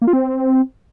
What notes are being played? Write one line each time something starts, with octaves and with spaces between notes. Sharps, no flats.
A#3
F4
C4